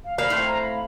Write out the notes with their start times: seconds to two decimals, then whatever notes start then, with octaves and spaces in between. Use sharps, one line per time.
0.04 F5
0.18 A#3 F5 B5
0.30 A2 A3 C4
0.47 A#5
0.62 B5